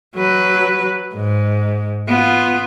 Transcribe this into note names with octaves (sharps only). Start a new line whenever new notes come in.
F#3 B4
G#2
B3 F4